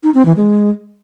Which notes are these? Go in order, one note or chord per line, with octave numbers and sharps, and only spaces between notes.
D#4
C4
E3
G#3